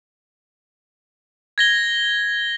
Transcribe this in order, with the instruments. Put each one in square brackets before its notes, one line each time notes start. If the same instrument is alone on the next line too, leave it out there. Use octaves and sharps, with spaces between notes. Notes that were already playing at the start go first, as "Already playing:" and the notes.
[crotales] G#6 A#6 G7